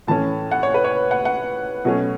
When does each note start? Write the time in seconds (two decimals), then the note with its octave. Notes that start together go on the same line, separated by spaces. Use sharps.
0.07 A2 E3 A3 C#4 A5
0.51 F#5
0.63 C#5
0.74 B4
0.84 C#5
1.11 F#5
1.25 F#5
1.85 B2 F#3 A3 C#4